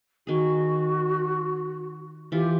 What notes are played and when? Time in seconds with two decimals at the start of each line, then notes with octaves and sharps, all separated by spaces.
0.27 D#3 F#4 G#4
2.32 E3 F4 G4